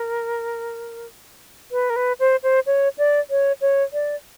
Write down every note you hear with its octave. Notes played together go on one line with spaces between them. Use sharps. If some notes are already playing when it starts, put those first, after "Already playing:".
Already playing: A#4
B4
A#4
B4
C5
C5
C#5
D5
C#5
C#5
D5